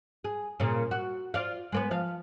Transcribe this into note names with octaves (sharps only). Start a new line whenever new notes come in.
G#4
A#2 C#3
F#4
F4 D5 F5
G#3 A#3 B3
F3 F5